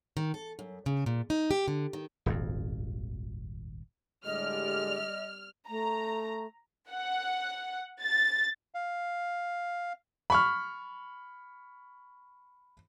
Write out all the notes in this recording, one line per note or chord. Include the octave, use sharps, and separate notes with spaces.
D#3
A4
F#2
C#3
A#2
D#4
G4
D3
D#3
D#1 G#1 F2
A2 D3 G3 G#3 D5 D#5 F6
A3 A#5
F#5
A6
F5
B5 C#6 F6